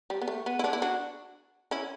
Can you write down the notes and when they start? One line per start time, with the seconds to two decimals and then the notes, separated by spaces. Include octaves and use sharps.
0.10 G3
0.22 B3
0.28 A3
0.46 B3
0.59 E4
0.64 B3 D4
0.73 E4
0.82 D4 F#4
1.71 C#4 E4